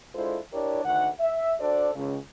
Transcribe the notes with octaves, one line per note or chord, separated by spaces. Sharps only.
G#3 D4 E4 F4 A4 C5
D4 E4 G4 A#4 C#5 D5
D2 D#3 F#5
E5
D4 F#4 A4 C5 D5
C#2 C#3